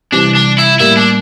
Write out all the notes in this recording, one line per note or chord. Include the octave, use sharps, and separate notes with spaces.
C3 E3 G3 D4
D4
E4
A2 G3 A#3 E4
D4